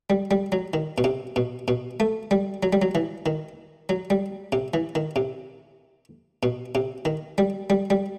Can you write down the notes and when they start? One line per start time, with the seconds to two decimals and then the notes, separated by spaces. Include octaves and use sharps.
0.10 G3
0.31 G3
0.52 F#3
0.74 D#3
0.98 B2
1.04 C3
1.36 B2
1.68 B2
2.00 A3
2.31 G3
2.63 F#3
2.73 G3
2.82 F#3
2.95 E3
3.26 D#3
3.89 F#3
4.10 G3
4.52 C3
4.74 E3
4.95 D#3
5.16 C3
6.43 B2
6.75 C3
7.05 D#3
7.38 G3
7.70 G3
7.90 G3